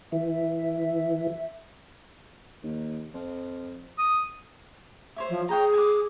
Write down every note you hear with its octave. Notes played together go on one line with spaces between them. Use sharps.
E3 E5
D#2
F2
D#6
C5 C#5 E5
F3
G#4 C#5 G5 A#5
G#5 D6